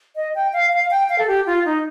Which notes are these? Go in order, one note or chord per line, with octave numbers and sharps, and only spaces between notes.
D#5
G5
F5
F5
G5
F5
A4
G4
F4
D#4